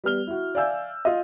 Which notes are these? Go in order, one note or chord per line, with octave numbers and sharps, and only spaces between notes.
G3 B3 F6 G7
E4 F#4
D5 E5 F5 G#5 E6 G6
F4 D#5